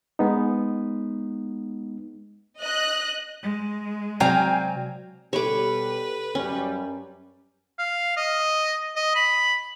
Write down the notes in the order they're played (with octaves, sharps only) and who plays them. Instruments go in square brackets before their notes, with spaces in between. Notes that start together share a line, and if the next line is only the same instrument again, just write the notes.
[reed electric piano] G#3 B3 D#4
[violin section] D#5 F#6
[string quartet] G#3
[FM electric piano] C3 C4 D5 [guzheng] F#3 F5 [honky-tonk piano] G5 G#5 A#5
[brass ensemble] B2 G3 [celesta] G4 A4 [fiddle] B4 [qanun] C#5 D6
[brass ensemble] F#2 G3 [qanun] C#4
[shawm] F5
D#5
D#5
B5